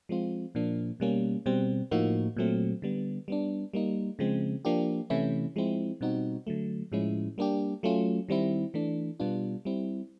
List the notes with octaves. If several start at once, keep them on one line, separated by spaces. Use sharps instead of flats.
F3 G#3 C4 F4
A#2 F3 A#3 D4
B2 G3 A#3 C#4
B2 G3 C4
A2 F3 A#3 D#4 F#4
A#2 F#3 A3 C4
D3 G3 B3
G3 B3 D4
G3 A#3 D#4
C#3 F3 G#3 C4
F3 A#3 D4 G4
C3 E3 A3 C#4 E4
F3 G#3 C4 E4
B2 G3 C4 D#4 F#4
D3 F#3 A3
A2 F3 G#3 C#4 E4
G3 A#3 D4 G4
F#3 A3 C#4 F4
D#3 G3 C4 E4
E3 A3 D4
B2 G3 B3 D4 F4
G3 C4 E4